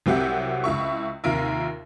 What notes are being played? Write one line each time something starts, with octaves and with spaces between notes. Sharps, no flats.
C2 F#3 C4 G4 E5 F#5
C#2 E4 E5 C#6
D#2 C3 F4 A#4 E5